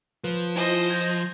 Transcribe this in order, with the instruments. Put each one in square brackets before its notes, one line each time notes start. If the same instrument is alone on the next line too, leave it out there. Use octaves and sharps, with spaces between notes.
[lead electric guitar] F3 [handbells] B4
[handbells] E4 F4 G#5 [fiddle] C5 D#5
[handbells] G6 G#6 A#6